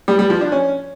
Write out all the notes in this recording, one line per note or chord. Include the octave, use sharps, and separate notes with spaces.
G3
G3
F3
D4
C#4